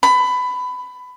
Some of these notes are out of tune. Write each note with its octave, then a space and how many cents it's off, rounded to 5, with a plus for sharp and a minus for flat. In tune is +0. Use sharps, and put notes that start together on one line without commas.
B5 +20